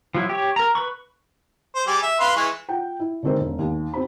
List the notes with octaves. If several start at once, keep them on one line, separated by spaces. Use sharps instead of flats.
F3 F#3 E4
G4 C#5
A#4 A#5
B4 B5 C#6
C5
G3 G#4 D6
E5
B4 F5 C6
E3 G#3 C#6
F4 F#5 G5
E4
D3 D#3 G#3 C4 A#4 C5
E1
D#2
C4 F#4 C5 B5